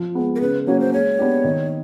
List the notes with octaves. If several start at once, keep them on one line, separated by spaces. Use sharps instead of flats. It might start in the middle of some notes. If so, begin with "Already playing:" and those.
Already playing: F3
G#3 B3
A#4
C#3 B4
F#3 A#3 C#4 F#4 C#5
C5
G#3 C#5
B3 D4 G4
D#3